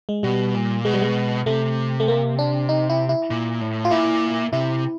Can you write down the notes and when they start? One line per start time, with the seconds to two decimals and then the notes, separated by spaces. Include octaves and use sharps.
0.09 G#3
0.23 B2 G3
0.54 A#2
0.85 B2 G#3
0.94 G3
1.02 G#3
1.46 C3 A3
2.00 A3
2.08 A#3
2.39 D4
2.69 D#4
2.90 E4
3.09 E4
3.30 A#2
3.61 A2
3.85 F4
3.91 A#2 E4
4.53 C3 E4